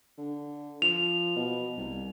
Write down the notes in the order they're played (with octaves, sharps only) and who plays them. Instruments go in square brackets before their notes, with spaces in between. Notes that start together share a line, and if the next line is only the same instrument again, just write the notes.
[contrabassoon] D3
[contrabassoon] F3 [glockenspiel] F7
[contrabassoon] B2
C2